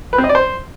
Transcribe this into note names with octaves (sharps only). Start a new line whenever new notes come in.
B4
C4
D#5
D5
C5